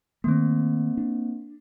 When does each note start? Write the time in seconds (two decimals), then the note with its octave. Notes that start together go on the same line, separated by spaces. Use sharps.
0.24 D#3 A3 A#3 C4
0.97 D4